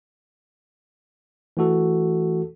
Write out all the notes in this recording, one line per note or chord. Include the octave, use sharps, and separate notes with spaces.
E3 A3 F#4 A4